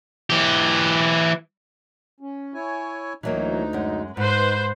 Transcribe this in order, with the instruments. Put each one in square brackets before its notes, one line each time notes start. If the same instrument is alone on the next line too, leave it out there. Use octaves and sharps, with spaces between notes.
[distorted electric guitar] E3 G4
[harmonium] C#4
E4 C#5 G#5
[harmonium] D2 D#4 [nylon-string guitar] E3 F#3 A#3
[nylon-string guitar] F#2 G#3
[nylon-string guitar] G#2 [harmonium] D#4 [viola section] B4 C5